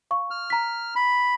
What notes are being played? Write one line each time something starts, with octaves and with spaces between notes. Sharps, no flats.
F5 C#6
F6
A#5 B6
B5